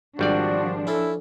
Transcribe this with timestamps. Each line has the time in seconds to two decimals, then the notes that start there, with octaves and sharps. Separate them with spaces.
0.19 G#1 F3 G3 D4 F#4 D5
0.87 C#4 E4 A4